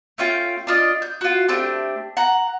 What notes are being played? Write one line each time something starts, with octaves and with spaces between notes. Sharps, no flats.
A3 C#4 F4 G5
D4 F4 D#5
G6
F4 F#4
A3 C4 D4 G4
F#5 A#5